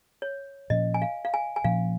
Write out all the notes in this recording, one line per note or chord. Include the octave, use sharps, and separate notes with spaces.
C#5
A#2 F3 C#4 D#5
G#5
F5
F5
G#5
G#5
A#2 F3 C#4 F5